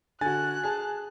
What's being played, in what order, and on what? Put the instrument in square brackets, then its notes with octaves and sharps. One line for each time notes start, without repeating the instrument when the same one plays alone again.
[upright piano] D3 F#4 [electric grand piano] G#5 A6 [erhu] F#6
[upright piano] G#4 A5